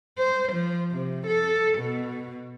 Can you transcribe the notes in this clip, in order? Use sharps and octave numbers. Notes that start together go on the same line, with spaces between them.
C5
F3
C3
A4
B2